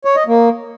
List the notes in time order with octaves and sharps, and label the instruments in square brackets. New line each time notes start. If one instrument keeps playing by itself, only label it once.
[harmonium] C#5
D#5
A#3